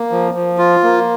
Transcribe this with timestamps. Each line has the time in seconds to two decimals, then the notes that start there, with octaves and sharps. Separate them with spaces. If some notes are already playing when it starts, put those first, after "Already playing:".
Already playing: A#3
0.11 F3
0.34 F3
0.58 F4
0.83 A#3